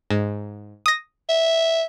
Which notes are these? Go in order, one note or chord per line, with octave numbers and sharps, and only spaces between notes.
G#2
D#6 A#6
E5